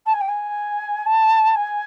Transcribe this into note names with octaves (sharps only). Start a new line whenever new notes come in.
A5
G#5
G5
G#5
A5
G#5